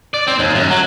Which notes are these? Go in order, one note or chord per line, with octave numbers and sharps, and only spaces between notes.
D5
C4
D#2
F#2
F#3